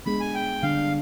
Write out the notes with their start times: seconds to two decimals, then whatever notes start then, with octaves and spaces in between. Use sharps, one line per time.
0.06 G#3 B3 D4 G#4 B5
0.20 G#5
0.34 G5
0.63 D3 G3 D4 F5